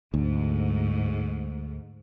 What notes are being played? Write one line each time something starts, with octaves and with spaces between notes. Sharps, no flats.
D2 G#2